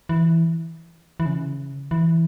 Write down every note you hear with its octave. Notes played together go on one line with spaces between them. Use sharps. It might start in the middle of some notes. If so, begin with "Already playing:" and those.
E3
E3
C#3
E3